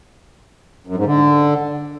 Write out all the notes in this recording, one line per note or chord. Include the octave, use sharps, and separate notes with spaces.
F#2
G#2
D3